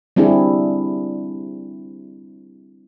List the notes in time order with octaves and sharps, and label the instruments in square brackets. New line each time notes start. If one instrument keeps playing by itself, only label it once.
[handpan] G3 C4 D4 E4 G4 G#4